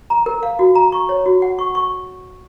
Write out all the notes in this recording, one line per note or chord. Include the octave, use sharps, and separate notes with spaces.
A#5
A#4
F5
F#4
A#5
C#6
C#5
F#4
F#5
C#6
C#6